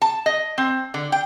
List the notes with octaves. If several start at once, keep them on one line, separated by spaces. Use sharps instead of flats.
A5
D#5
C4
D3
G5